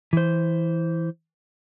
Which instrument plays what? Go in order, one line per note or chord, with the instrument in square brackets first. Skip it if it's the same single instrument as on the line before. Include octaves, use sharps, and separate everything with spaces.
[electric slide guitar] E3 C5